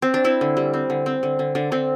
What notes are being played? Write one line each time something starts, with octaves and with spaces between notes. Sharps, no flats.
C4
D4
C4 E4
D3
G3
C4
D3
C4
D3
D3
D3 D4
D3 C4